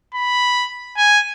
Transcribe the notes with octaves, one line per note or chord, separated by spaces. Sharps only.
B5
G#5